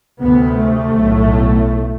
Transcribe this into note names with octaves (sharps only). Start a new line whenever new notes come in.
D2 C3 B3
A3
B1 A2